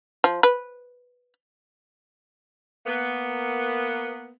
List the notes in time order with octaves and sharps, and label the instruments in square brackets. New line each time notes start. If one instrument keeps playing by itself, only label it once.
[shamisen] F3
B4
[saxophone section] A#3 B3